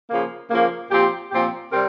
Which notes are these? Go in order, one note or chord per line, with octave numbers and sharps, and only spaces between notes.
C#3 F3 A#3
C#3 F3 A#3
A#2 F3 C4 G4
A#2 F3 C4 G4
C3 G3 C4 G4 A#4